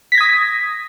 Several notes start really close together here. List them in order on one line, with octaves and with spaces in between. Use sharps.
B6 A#6 G#6 D#6